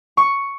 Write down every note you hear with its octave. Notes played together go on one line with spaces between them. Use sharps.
C#6